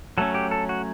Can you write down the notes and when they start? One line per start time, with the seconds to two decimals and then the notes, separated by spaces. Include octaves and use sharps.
0.18 F#3 A3 C#4 A4
0.34 G4
0.51 A4
0.69 F#4